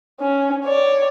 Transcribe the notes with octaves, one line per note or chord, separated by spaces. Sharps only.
C#4
C#5 D5